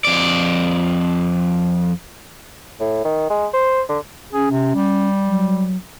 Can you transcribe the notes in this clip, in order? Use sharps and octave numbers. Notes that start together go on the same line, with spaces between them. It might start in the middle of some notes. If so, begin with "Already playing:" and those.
F2 D5
A2
D#3
G#3
C5
D3
C#4 G#4
C3
G3
F#3